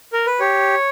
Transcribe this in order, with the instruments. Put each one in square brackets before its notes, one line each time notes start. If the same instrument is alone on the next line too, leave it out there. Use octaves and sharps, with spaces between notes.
[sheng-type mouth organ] A#4
B4
G4 C#5